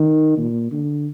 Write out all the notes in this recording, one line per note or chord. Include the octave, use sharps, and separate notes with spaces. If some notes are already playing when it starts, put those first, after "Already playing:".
Already playing: D#3
A#2
D3